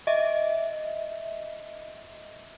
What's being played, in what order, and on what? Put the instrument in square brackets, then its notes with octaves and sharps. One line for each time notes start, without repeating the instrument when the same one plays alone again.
[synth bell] D#5 E5